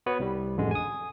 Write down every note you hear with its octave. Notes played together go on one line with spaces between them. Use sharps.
B3 F#4 B4 C#5
C2 G3
A1 F2 D3 G#3
G#5 D#6